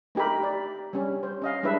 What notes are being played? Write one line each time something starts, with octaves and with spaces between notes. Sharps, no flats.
A3 D#4 G4 A#4 B5
D5
G3 C#4
C5
C#4 D#5 F5
G3 G#3 D4 E4 B4 E5